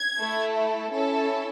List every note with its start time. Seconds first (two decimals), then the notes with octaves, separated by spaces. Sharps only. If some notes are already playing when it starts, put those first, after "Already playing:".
Already playing: G#6
0.19 A3 E4 A4
0.92 C#4 E4 A4